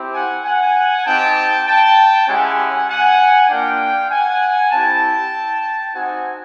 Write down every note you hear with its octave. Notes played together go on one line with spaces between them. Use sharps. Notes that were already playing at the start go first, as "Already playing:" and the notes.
Already playing: C4 E4 G4
F#5 G#5
F#5 G#5
C4 D#4 G4 G5 A5
G5 A5
G#3 C#4 E4 G4 F#5 G#5
F#5 G#5
A#3 D4 F4 F5 G5
F#5 G#5
C4 E4 G4 G5 A5
C4 D#4 F#4 F#5 G#5